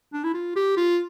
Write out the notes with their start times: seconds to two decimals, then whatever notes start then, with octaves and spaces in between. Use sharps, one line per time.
0.13 D4
0.24 E4
0.34 F4
0.56 G4
0.77 F4